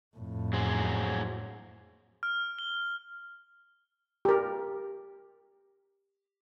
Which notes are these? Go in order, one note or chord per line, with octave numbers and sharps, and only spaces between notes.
F2 A2
F#3 G#4 C5
F6
G7
G4 A#4